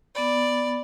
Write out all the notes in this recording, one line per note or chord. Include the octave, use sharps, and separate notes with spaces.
B3 D5 B5